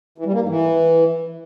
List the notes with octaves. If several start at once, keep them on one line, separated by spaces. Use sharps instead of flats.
E3
G3
A#3
G#2
E3